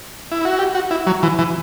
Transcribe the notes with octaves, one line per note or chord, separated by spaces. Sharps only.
E4
F#4
G4
F#4
E4
F#3
E3
E3